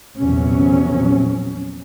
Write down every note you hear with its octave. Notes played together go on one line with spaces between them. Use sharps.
A#1 E2 C3 F#3 C#4